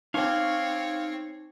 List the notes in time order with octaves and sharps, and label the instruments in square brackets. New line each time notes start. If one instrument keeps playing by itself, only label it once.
[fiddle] C4 C#5 [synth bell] D#4 [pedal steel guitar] F5 C#6